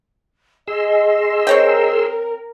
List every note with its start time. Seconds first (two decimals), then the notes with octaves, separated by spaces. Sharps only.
0.68 G#4 D#5 C6 E6
1.47 C4 A#4 C#5 G5